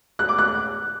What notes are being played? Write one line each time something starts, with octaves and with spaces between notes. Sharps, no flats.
F#6
D6
F#6